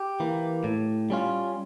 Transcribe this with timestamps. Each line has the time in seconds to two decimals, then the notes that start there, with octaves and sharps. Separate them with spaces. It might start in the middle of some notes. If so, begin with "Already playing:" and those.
Already playing: G4
0.20 E3 A#3
0.64 A2
1.10 G3 C#4 F4